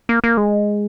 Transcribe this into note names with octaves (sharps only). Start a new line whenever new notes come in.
A#3
A#3
G#3